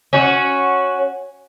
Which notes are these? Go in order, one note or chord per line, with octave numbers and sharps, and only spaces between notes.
C#4 F#4